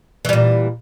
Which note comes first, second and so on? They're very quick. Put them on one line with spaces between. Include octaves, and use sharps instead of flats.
E3 G3 A#2